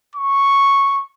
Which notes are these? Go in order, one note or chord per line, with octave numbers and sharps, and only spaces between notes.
C#6